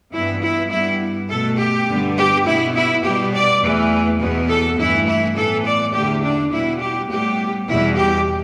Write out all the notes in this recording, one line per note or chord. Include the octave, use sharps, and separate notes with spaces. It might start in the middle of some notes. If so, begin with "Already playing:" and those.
G2 E3 B3 E4
E4
G2 G3 B3 E4
B2 A3 A4
G4
G2 D3 G3 B3
G4
B2 B3 E4
E4
B2 G3 B3 G4
D5
E2 E3 A3
E2 B2 B3
A4
G2 E3 A3 E4
E4
A2 E3 B3 A4
D5
E2 D3 A3 G4
D4
B2 G3 B3 E4
G4
A2 G3 B3 G4
E2 B2 G3 E4
G4